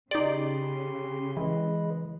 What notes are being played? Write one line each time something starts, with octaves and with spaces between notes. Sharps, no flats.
C#3 D#4 G4 D5 C6
E3 G#3 B4 D#5